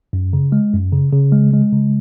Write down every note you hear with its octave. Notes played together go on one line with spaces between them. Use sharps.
F#2
C#3
G#3
F#2
C#3
C#3
G#3
G#3
C#3